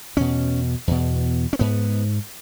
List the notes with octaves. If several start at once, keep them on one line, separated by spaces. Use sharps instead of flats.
E2 B2 C#4
E2 B2
C#4
G#2 B3